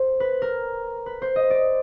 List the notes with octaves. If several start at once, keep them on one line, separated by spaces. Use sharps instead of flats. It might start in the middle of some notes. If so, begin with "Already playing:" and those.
Already playing: A4 C5
B4
A#4
B4
C5
D#5
D5